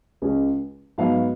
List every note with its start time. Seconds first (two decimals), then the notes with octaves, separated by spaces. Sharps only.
0.22 C#2 C#3 G#3 C#4
0.98 G#2 F#3 B3 F5